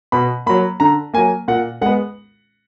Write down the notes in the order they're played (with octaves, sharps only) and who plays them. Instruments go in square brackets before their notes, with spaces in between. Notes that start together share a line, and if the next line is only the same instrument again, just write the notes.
[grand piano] B2 B5
F#3 A#3 B5
D3 A#5
F#3 A#3 G#5
A#2 F#5
G#3 B3 F#5